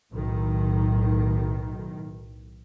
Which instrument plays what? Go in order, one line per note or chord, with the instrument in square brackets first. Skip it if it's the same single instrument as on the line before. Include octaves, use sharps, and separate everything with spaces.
[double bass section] B1 A2 D#3